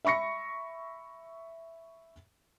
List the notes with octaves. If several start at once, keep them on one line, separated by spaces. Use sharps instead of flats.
E5 B5 C#6 A#6 C#7